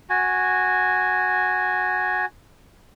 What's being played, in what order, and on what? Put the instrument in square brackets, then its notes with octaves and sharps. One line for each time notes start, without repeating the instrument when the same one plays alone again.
[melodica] F#4 G#5